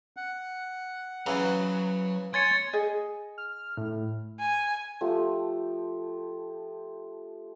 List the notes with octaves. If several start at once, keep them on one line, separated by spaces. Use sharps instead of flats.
F#5
C#3 E3 F#3 A#5
C#5 G#5 C6 G#6 A6 C#7
G#4 D#5
F6
A2
G#5
F3 A3 G4